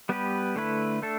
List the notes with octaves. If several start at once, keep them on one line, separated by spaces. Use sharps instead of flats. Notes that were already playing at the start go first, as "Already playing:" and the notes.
G3 B3 G4 B4
D3 A3 E4 B4
A3 D4 A4